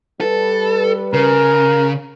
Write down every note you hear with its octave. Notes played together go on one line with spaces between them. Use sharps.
G3 A4 B4
C#3 A#4